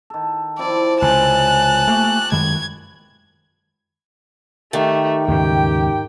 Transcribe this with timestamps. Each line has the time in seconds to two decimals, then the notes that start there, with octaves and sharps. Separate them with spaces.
0.10 D#3 A4
0.58 F3 C4 E4 D5
1.02 C#2 C3 G#5 A5 F#6
1.87 A3 A#3 G4 C#6
2.32 F#2 D#3 G#3 B4 G#6
4.73 D#3 A3 G4
5.28 D#2 G#2 C#3 G4 G5